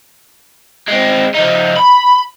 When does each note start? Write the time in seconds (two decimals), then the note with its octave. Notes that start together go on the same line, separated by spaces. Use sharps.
0.88 G#3 C4
1.35 F3 D#4
1.77 B5